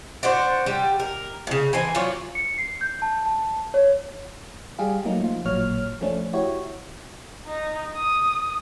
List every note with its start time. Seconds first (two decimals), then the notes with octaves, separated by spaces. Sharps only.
0.23 D4 F#4 C5
0.66 G3
1.00 A#4
1.47 A2 C#3
1.73 E3 C5 G#5
1.95 F#3 F4 C#5 D5
2.35 C#7
2.58 C7
2.81 G6
3.02 A5
3.26 A5
3.74 C#5
4.79 G3 G4 G#4 F5
5.05 F#3 A3 A#3 D#4
5.22 F3 F4
5.45 A1 A#2 F#3 C#5 F6
6.01 F3 A3 C#4 D4
6.33 E4 F#4 G4 C#5
7.47 D#4
7.96 D#6